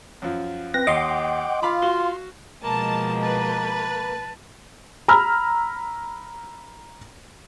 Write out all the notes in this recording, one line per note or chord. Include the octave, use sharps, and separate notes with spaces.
F#2 F3
C4 B4 A#6
D#2 D#5 F#5 G5 C6 D6
F4 F5 B5 D6
F#4 F5 C6
B2 F3 G#3 A#3 A5
B4 A5
A#5 B5 E6 F6